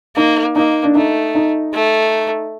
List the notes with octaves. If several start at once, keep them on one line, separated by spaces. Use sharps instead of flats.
A#3 D#4
A#3 D#4
D4
A3 D#4
D#4
A3